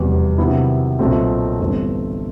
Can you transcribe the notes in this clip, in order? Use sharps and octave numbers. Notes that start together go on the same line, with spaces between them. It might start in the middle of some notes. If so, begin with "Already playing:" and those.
Already playing: F1 E2 B2 G3
C3 D#3 F#3 B3 E4
B1 A#2 F#3 A3 C4
G1 G2 E3 A3 C4